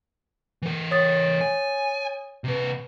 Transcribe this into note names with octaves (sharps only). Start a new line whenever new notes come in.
E3 A#4
C#5 D#6 A6
G#5
C3 B4